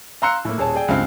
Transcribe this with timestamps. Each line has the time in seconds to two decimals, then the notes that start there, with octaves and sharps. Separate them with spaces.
0.22 F5 A#5 C6 E6 F#6 C#7
0.45 A2 A#3
0.58 D#1 G#4 C#5 A5
0.75 G#4 D5 G5
0.88 C#2 G2 C4 F5 G5